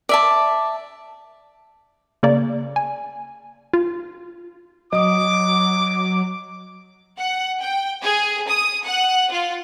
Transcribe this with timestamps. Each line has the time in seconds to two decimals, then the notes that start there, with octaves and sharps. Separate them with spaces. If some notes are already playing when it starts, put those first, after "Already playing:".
0.09 D5 E5 A5
2.23 C#3 A#3 D5
2.76 G#5
3.73 F4
4.92 F#3 D#5 D6 D#6
7.20 F#5
7.62 G5
8.03 G#4
8.49 D#6
8.86 F#5
9.31 F4